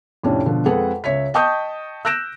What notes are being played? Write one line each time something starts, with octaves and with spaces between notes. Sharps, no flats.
F2 A2 C3 C#4 D4
B2 D3 F3
F2 G#3 G#4 A4 B4 F#5
C#2 C#5 E5 B6
D#5 G5 A5 C#6 D#6 G6
E6 F#6 G6 A#6 D7 E7